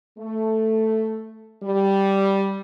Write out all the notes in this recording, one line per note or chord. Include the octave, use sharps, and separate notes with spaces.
A3
G3